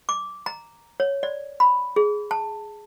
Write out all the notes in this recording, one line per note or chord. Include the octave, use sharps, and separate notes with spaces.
D6
A#5
C#5
D5
B5
G#4
A5